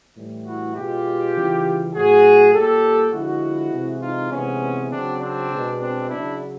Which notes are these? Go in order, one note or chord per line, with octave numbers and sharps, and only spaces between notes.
A2 E3 G3
E4 F#4
B2 G#3 F4 G4
C#3 E3 G3
A2 F#3 F#4 G#4
A#2 G3 G4 A4
D3 F3 G#3 E4 F#4
C3 E3 G#3
D#4 F4
C3 E3 G#3 B3 C#4
C#3 F#3 C4 D4
C4 D4
B2 G#3
C4 D4
C#3 F#3 D4 E4